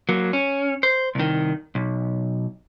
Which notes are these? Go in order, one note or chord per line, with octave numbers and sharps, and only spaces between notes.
F#3 A#3
C#4
C5
C2 D#3
B1